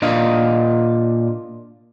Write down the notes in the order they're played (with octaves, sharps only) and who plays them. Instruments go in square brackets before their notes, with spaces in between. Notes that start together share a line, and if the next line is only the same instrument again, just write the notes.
[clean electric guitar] A#2 D4 D#5 F5